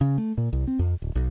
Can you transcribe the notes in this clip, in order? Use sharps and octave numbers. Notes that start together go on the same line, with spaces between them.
C#3
A3
A#2
C2
C4
F2
D1
B1